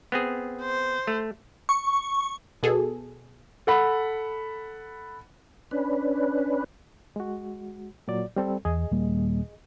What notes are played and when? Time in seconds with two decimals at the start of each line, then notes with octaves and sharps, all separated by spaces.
0.12 B3 C4 G#4
0.62 C5
1.07 A3
1.69 C#6
2.63 B2 G#4 A4
3.67 A4 F#5 B5
5.71 C#4 D4 B4
7.16 G#3 F#4
8.08 A#2 F#3 D5
8.36 G3 C4 A4
8.65 E2 G#4 D#5
8.91 D#1 G3 A#3